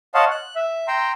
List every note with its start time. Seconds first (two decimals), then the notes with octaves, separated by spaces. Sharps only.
0.14 C#5 D#5 F5 F#5 A5 C6
0.31 F#6
0.56 E5
0.88 G5 A#5 C6 E6